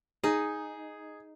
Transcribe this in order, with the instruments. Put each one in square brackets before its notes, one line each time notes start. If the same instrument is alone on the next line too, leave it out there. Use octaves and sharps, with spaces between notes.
[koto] D#4 [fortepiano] G#4